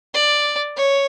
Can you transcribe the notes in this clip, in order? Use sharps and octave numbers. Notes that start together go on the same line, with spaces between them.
D5
C#5